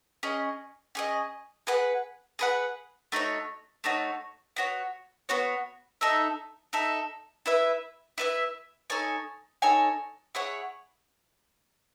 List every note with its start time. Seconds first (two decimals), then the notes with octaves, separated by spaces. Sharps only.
0.23 C#4 G#4 D#5
0.95 C#4 G#4 D#5
1.67 G#4 B4 F#5
2.39 G#4 B4 F#5
3.12 A3 D#4 F#4 C#5
3.84 A3 D#4 F#4 C#5
4.56 B3 F#4 C#5
5.29 B3 F#4 C#5
6.01 D#4 A4 E5
6.73 D#4 A4 E5
7.46 E4 B4 E5
8.18 E4 B4 E5
8.90 D#4 A4 C#5 G#5
9.62 D#4 A4 C#5 G#5
10.35 E4 G#4 C#5 F#5